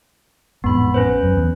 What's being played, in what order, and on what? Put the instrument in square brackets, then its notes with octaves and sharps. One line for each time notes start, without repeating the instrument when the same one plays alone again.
[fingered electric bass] A1 F2 G#2 [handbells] B3 B5
[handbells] C#4 B4 C5
[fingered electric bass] F#2
E2